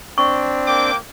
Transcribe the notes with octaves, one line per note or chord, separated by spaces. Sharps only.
C4 D4 C#6
A#3 G5 D6